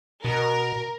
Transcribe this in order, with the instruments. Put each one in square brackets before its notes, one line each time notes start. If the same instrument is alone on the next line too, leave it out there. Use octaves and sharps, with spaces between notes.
[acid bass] B2 [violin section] A#4